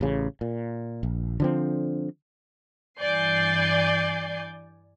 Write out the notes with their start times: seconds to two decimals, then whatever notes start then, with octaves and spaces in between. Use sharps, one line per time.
0.01 A1 C#3
0.41 A#2
1.03 A#1
1.40 D3 F3 C4
3.01 G2 E3 D5 G#5 G6 C7